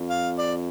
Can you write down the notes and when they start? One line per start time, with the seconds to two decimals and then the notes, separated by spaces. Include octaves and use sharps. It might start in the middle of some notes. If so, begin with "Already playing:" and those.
Already playing: F2
0.10 F5
0.38 D5